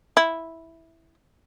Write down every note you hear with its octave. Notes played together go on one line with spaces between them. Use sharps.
E4